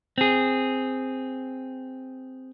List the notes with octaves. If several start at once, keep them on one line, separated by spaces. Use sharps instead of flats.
C4 G#4